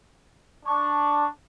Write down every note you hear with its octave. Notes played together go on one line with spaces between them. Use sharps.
D4 C#6